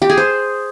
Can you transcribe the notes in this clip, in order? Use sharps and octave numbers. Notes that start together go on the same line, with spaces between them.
G4
G#4
C5